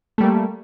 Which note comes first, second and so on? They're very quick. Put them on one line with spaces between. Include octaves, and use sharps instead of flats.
A3 G3 A#3